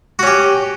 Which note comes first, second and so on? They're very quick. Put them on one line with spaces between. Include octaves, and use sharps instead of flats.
F#4 C#4 G4